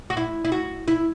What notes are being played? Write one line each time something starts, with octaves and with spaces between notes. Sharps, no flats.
F#4
E4
E4
F#4
E4